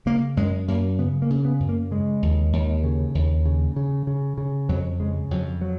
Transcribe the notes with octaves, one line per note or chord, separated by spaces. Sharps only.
C#3 A#3
F#2 G#3
F#2 A#3
C#3 B3
A#3
C#3
B3
F#2
A#3
C#3 G#3
D#2
D#2
C#3
D#2
C#3
C#3
C#3
C#3
F2 F#3
C#3 G#3
F2 F#3
F#3